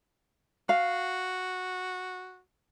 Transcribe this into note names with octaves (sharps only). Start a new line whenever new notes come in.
F#4 F5